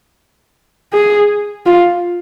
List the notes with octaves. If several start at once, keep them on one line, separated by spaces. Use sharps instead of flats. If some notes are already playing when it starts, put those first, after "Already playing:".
G#4
F4